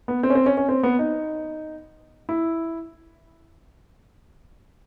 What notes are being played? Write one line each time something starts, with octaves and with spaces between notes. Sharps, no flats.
B3
C4
C#4
C4
C#4
C#4
C4
B3
D#4
E4